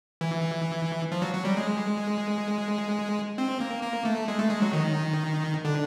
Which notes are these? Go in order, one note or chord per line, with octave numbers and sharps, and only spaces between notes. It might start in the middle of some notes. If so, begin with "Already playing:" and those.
E3
F3
F#3
F#3
G3
G#3
C4
A#3
A#3
A3
G#3
A3
G#3
F#3
D#3
D3